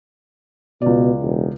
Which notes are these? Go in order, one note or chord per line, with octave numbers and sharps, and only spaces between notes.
C#2 B2 D5
E1